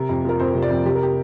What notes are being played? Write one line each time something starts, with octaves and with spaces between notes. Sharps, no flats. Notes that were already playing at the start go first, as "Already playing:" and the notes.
Already playing: C3 A#4
F2
F3 A#4
F2 C5
C3
D5
F2
C3 G4
A#4
G4